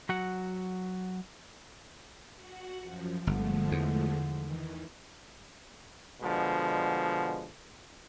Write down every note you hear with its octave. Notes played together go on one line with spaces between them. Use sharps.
F#3 F#4 F#5
F#4 F#5
F#2 F3
G1 D3 F3 G#3 A3
E2
D#3 E3
B2 D3 F3 G#3